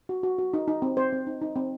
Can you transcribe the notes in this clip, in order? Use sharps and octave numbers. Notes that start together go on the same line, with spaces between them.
F#4
F#4
F#4
D#4
D#4
C4
C4 C5
C4
D#4
D#4
C4